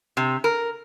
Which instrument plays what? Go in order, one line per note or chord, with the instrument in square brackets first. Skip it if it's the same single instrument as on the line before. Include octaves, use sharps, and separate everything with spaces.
[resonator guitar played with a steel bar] C3
A#4